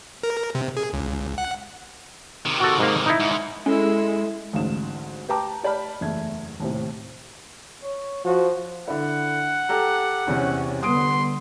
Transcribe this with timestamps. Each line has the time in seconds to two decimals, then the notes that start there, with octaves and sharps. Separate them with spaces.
0.23 A#4
0.55 C3
0.77 G#4
0.93 C#2
1.38 F#5
2.45 C3 D#3
2.60 F#4 A4
2.79 G#2 A#3
3.06 D#4 E4
3.20 G#2
3.66 G#3 C#4 E4 A4
4.53 A1 D2 G#2 F5 E7
5.29 G4 B4 G5 A5 A#5 D6
5.64 G4 D5 A5 B5 F6
6.01 F#1 E2 A3 E5 G#6
6.60 D#2 A2 C3
7.83 C#5
8.25 F3 F#4
8.88 D3 E4 F#5
9.69 G4 A4 A#5
10.27 E2 C3 C#4
10.83 D3 G3 B3 C6 D#6 D7